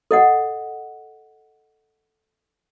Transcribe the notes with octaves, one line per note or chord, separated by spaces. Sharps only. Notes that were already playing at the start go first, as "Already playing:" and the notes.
A4 D#5 F#5